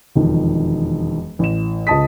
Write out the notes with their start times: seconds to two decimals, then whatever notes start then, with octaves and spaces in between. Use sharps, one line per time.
0.16 E1 F2 D#3
1.39 A1 E7
1.87 C#2 D#5 A5 D#6 B6